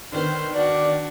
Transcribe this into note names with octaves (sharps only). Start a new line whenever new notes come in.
D3 D#3 B3 C5
D4 F#4 D5